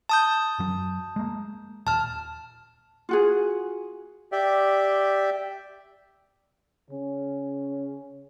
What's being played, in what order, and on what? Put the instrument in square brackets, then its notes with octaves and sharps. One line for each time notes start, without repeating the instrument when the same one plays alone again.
[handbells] A5 D#6 G6
[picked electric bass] F#2 F#3
G#3 A#3
[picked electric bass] D#1 [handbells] A5 F6
[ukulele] F4 F#4 G#4
[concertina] G4 D5 E5
[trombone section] C#3 C#4